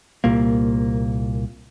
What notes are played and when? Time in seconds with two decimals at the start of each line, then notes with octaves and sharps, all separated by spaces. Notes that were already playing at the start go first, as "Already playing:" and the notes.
0.24 C2 A#2 A#3